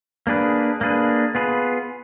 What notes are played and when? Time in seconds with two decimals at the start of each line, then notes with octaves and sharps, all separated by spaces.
0.27 A#3 D4 G#4 B4
0.81 A#3 D4 G#4 B4
1.35 B3 F4 G#4 B4